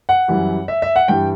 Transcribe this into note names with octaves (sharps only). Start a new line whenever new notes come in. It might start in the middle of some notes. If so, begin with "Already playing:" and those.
F#5
F#2 E3 G3
E5
E5
F#5
G2 E3 G3 G5